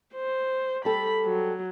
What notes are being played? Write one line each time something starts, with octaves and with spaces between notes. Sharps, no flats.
C5
G3 C4 A4 B5
F#3